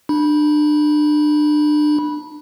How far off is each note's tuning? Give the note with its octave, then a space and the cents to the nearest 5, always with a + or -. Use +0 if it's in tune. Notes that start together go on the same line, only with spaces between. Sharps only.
D4 +30 B5 -20